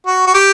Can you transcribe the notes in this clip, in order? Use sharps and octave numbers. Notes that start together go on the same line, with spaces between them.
F#4
F#4
G4